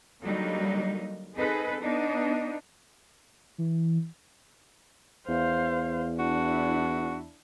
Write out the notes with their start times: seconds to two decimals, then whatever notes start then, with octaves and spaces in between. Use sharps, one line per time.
0.24 D3 F#3 G3 A#3 D#4
1.34 C4 D#4 G#4 A4 B4
1.81 B3 D4 D#4
3.58 E3
5.28 E2 C5 F5
6.19 D4 E4 F#4